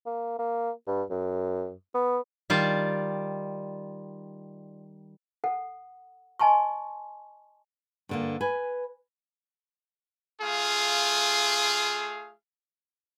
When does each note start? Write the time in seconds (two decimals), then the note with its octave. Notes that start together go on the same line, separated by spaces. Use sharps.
0.06 A#3
0.39 A#3
0.87 G2
1.10 F#2
1.94 B3
2.50 D#3 G3 F4 D5 A5
5.44 A4 F#5
6.39 D#5 G#5 A5 C6 C#6
8.09 G2 D3 A#3
8.41 B4 G#5
10.41 A3 F4 G#4 F5